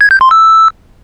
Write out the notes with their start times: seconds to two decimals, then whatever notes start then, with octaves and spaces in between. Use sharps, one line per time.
0.01 G#6
0.11 G6
0.21 C6
0.31 E6